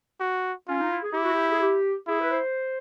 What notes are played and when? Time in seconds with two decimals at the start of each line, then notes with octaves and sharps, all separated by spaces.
0.20 F#4
0.68 C#4 F4
0.80 D#4
0.90 E4
1.03 G#4
1.13 E4 G4
1.23 F#4
1.32 G4
1.52 G#4
1.61 G4
2.07 E4 G#4
2.21 B4
2.31 C5